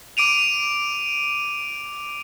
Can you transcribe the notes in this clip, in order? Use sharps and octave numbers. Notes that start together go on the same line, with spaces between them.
D6 D7 D#7 F7